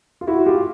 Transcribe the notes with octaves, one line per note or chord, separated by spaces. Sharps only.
F4
E4 F#4
F4 G4